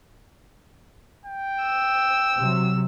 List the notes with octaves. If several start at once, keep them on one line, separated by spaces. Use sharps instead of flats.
G5
E6
C3 F#3